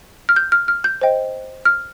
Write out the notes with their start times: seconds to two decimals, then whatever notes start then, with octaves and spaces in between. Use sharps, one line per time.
0.29 F6
0.36 G6
0.52 F6
0.68 F6
0.84 G6
1.01 C5 D#5 G5
1.65 F6